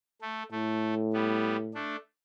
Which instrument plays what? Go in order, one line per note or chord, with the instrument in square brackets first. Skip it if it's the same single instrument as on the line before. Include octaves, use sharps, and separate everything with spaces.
[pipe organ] A3
[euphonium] A2 [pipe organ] A3
[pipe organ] G3 B3
A3 D4